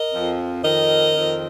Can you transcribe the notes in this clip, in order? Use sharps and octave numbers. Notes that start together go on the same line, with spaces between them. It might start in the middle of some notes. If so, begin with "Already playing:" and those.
Already playing: A#4 D#5
F2 F3 C4
F2 D#3 C4 A#4 D#5
F2 D#3 C4